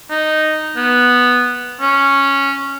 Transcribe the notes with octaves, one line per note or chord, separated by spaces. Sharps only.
D#4
B3
C#4